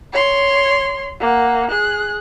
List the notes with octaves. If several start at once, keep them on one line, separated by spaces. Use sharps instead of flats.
C#5 C6
A#3 F#5
G#4 F#6